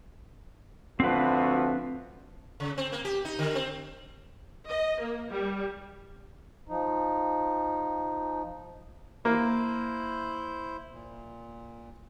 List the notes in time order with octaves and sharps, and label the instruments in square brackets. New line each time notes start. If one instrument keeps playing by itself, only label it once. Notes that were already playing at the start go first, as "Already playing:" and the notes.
[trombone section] D2 F3 F#4 [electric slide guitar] C4 B4
[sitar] C#3
C4
A#3
G4
D#4
D3
C4
[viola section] D#5
A#3
G3
[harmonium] F3 D#4
[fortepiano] A#3 [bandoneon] E4 C5
[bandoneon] A#2